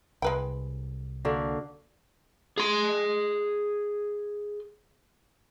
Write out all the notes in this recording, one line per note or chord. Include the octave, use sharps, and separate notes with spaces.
C2 G#3 B4 G5
D3 A#3 F#4
G#4 C6